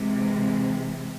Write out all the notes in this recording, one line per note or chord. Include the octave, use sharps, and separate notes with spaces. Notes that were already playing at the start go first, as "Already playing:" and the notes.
Already playing: C3 E3 G#3